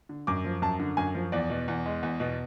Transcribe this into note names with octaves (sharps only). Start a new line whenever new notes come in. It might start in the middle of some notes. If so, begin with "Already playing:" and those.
D3
F#2 D6
F3
F#2 A5
D3
F#2 G#5
F3
E2 D5
B2
E2
G#3
E2
B2